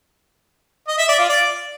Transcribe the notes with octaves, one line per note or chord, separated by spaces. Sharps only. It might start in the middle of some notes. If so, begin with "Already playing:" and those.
D#5
E5
D5
F4
D5